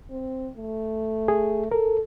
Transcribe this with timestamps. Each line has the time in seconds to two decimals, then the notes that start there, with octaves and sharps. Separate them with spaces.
0.10 C4
0.57 A3
1.28 G#4
1.72 A4 A#4